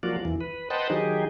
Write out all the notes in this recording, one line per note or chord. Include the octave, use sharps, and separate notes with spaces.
F3 F#3 A#3 F4 F#4 D5
E2 E3
B4
B4 C5 D#5 F#5 G5 A5
D#3 F#3 D#4 G4 G#4